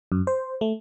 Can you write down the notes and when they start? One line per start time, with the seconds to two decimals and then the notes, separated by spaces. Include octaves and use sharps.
0.12 F#2
0.27 C5
0.61 A3